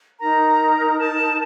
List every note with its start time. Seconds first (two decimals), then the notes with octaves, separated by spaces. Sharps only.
0.19 D#4 A#4 A#5
0.99 A5